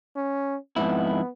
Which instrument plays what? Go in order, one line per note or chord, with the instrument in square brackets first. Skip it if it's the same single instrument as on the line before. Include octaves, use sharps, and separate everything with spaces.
[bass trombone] C#4
[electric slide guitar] F2 G#2 E4 [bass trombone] B3